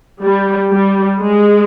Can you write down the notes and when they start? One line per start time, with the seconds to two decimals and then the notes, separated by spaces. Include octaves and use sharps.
0.21 G3
0.70 G3
1.21 G#3